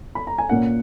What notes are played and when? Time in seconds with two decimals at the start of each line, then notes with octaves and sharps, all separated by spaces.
0.15 B5
0.27 A#5
0.38 G#5
0.49 A#2 A#3 C#4 F#5